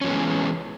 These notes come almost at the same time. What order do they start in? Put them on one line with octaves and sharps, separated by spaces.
C#4 F3 B3 G#3 E3